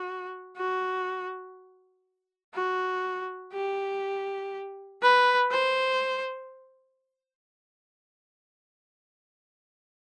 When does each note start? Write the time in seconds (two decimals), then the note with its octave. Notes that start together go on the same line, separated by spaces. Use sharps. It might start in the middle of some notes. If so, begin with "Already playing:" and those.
Already playing: F#4
0.57 F#4
2.54 F#4
3.53 G4
5.02 B4
5.51 C5